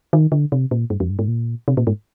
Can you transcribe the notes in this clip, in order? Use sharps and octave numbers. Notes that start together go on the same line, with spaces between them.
D#3
D3
C3
A#2
G2
F2
G2
G#2
A#2
C3
A#2
G#2